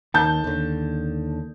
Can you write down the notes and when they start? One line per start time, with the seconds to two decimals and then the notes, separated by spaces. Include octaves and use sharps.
0.14 D#2 D#3 A5 G6
0.44 D#2 D3